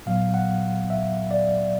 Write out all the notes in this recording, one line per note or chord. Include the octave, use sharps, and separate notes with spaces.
A#2 F#3 B3 F5
F#5
E5
D5